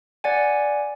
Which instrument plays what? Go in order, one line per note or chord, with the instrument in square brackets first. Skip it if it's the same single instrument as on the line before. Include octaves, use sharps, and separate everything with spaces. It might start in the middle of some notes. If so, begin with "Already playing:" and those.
[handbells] D5 F#5 G#5